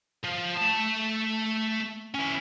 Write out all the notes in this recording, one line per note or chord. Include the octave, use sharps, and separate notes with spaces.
F3
A3 A5
C#4 E4